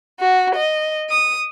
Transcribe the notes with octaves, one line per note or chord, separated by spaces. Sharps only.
F#4
D#5
D#6